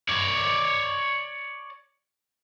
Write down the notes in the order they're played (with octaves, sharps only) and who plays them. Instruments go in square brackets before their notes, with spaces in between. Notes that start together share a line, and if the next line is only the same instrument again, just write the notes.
[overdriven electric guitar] C#5 D5